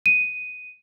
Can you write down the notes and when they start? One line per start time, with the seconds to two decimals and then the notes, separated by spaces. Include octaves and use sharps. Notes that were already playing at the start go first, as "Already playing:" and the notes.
0.06 D#7